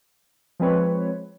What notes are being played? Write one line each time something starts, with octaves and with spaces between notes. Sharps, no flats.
F3 G#3 C4 B4 C#5